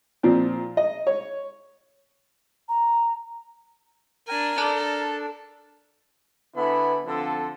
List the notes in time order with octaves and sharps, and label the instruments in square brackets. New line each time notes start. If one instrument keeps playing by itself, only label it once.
[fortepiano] A#2 F3 C4
D#5
C#5
[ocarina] A#5
[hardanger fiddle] D4 G#5 [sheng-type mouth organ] A#4
[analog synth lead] D4 [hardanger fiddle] A4 [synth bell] D5 A5
[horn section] D3 B3 E4 G#5 B5
D3 F3 C4 F4 A4